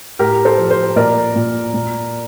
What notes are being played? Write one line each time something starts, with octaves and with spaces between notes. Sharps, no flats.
A2 G4 A#4
A4 C5
F3
A4 C5
A#2 A#4 D5
A#2
A#2